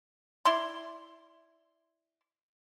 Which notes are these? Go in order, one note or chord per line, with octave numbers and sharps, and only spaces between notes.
E4 D5 C6